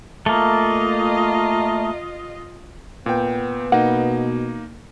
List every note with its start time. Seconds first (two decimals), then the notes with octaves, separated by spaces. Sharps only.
0.26 A3 A#3 F4 D#5
3.06 A#2 B3 G5
3.72 B2 A#3 D#4 F#5